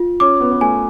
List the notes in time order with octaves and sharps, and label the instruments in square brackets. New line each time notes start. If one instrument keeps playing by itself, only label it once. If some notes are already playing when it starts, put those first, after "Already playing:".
Already playing: [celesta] F4
[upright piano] C#4 [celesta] D6
[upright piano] B3
B3
[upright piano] A3 [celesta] G#5